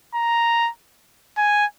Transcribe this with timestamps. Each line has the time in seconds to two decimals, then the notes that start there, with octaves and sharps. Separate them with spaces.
0.15 A#5
1.38 G#5